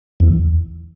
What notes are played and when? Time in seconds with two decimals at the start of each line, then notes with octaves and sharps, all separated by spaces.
0.20 E2